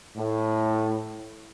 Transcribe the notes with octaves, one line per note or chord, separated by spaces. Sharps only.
A2